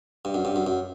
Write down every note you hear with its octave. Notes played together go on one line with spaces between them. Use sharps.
G2
F#2
G2
F#2
F#2